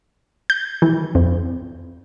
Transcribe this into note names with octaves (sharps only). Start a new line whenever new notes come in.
G6
E3
F2